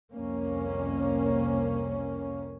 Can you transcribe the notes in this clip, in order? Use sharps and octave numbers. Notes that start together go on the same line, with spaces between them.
C2 F2 A#3 C#4